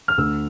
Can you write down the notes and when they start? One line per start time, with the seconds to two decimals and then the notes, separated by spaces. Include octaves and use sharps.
0.08 F6
0.18 D2 E6